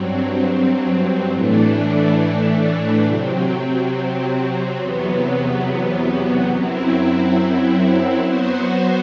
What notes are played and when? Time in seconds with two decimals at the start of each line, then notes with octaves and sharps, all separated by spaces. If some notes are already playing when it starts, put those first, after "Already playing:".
Already playing: G2 F#3 C4
1.31 A2 E3 A3 D4
3.05 C3 F#3 C4
4.78 E2 C3 F#3 B3
6.51 F#2 F#3 C4 E4
8.24 F#3 B3 F#4 C5